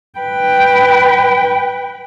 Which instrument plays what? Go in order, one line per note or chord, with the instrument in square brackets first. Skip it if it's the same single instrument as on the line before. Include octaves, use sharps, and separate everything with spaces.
[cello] B4 G5